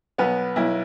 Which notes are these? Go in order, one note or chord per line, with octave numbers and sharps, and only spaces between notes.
B1 B3 B4
B1 E4